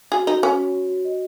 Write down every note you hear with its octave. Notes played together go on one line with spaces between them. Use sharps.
F#4 G#4
D#4 F#4
C#4 C#5
F#4
F#4
F#4
D#5